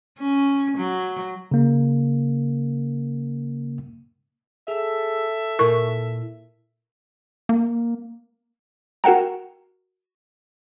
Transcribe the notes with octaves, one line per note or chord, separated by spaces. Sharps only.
C#4
F#3
C#3 A#3
G#4 A4 E5
A#2 E4 A#4 C#6
A#3
F#4 A#4 F#5 G5 A#5